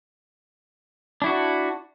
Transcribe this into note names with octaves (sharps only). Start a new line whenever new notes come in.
D4 E4 F#4